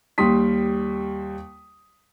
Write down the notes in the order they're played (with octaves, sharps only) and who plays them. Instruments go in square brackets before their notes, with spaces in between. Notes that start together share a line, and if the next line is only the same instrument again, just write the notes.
[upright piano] D#2 G3 C6 D#6 B6